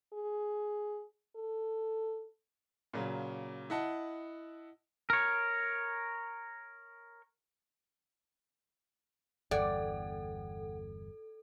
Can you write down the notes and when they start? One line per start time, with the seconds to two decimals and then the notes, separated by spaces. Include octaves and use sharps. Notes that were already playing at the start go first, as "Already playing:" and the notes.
0.13 G#4
1.36 A4
2.93 A#2 C#3 F#3
3.70 E4 D#5 F#5 A5
5.10 A#4 C#5
9.51 G1 E2 A4 D5 F#5 G5